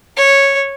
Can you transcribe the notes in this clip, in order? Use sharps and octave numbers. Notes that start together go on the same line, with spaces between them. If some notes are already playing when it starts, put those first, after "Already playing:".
C#5